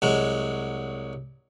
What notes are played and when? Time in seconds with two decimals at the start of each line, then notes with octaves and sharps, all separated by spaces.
0.02 C2 F#3 G#3